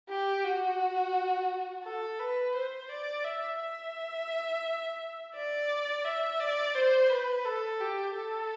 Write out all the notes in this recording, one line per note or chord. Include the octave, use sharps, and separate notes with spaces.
G4
F#4
A4
B4
C5
D5
E5
E5
D5
E5
D5
C5
B4
A4
G4
A4